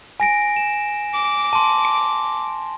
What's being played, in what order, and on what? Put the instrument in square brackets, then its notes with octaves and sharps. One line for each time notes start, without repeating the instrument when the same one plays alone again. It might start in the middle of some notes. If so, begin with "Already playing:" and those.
[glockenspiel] G#5 A#6 D7
E7
[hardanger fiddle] D6
[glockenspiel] A5 C6